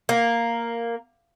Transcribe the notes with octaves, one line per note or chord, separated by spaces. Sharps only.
A#3